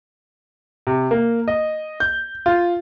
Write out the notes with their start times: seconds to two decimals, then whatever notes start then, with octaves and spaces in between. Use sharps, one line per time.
0.87 C3
1.11 A#3
1.48 D#5
2.00 G6
2.46 F4